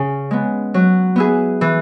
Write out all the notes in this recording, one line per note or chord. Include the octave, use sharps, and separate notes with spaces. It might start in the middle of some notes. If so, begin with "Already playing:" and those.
Already playing: C#3
G#3 B3
F#3
B3 E4 G#4
E3